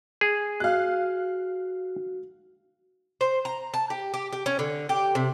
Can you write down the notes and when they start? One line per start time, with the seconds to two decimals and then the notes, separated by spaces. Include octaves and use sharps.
0.21 G#4
0.60 F#4 F5 F#6
3.21 C5
3.45 A#5
3.74 A5
3.90 G4
4.14 G4
4.33 G4
4.46 C#4
4.59 D3
4.89 G4
5.15 C3